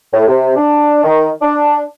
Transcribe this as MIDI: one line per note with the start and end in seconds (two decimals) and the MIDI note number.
0.12 0.25 45
0.28 0.55 48
0.56 1.03 62
1.04 1.28 51
1.42 1.80 62